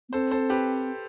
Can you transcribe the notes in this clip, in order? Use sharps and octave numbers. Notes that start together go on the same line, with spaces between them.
B3
C4 A4 C5
A4 C5
G4 B4